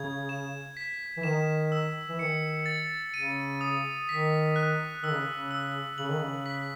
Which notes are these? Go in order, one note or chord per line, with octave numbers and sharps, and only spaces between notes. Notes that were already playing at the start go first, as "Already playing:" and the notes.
Already playing: C#3 G#6
E7
B6
E3
D#3 E7
E6
E3
D#3 C#7
A6
C#3 D#7
D#6
D#3 B6
F#6
D#3 E6
C#3
C#3
E6
C#3 F#7
D#3
C#3
B6